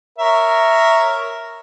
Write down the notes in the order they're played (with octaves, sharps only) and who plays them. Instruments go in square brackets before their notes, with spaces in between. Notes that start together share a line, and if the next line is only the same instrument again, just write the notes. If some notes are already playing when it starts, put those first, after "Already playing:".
[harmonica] A#4 C#5 E5